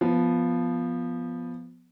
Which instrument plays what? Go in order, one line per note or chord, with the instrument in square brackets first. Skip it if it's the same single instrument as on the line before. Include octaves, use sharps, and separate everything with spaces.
[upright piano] F3 B3